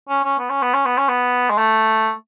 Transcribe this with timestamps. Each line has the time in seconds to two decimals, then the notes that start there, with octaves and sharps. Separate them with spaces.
0.09 C#4
0.24 C#4
0.39 B3
0.50 C#4
0.62 B3
0.74 C#4
0.86 B3
0.98 C#4
1.09 B3
1.50 G#3
1.58 A3